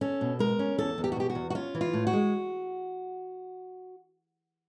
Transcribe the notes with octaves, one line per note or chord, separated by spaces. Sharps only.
C#4 A4
B2
G#3 A#4
C#4
E2 A4
E2
G4
F#4
B2 G4
F#4
E2
F#4
C#4 F4
E3
F4
A2
F#4
G#3